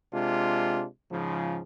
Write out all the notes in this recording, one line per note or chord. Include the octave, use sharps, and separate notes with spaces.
C3 G#3 D4 F4
G#2 C#3 F3